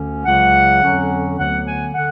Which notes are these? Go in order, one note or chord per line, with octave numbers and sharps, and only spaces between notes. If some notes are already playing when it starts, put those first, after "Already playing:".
Already playing: D2 D3 C#4
C#2 C#3 F#3 F#5
F2 D3 F#3 C#4
D2 D3 F#3 B3 F#5
G#5
D3 F#5